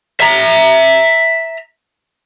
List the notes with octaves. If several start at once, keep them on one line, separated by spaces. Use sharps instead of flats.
E5 A#5